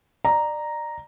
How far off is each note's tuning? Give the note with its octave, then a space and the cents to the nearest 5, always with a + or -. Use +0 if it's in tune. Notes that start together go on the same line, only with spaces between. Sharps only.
D5 +30 A#5 +0